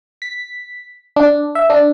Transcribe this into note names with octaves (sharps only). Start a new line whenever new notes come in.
B6
D4
E5
D4